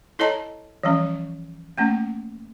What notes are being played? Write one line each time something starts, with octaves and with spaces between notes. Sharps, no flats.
E4 A4 C#5 D#5 A5 A#5
E3 F3 G3 C#4
A3 A#3 C#4